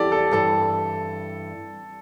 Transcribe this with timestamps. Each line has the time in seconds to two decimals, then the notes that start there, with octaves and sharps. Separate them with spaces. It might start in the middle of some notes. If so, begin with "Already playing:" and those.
Already playing: E2 E3 G4 A4 D5
0.12 A4
0.31 G2 E3 G3 A4